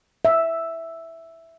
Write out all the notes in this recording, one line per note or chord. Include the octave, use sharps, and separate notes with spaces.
E5